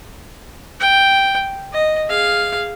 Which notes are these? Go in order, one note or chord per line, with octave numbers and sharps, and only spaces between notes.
G5
D#5
G#4 F5